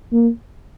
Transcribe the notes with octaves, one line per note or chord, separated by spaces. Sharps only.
A#3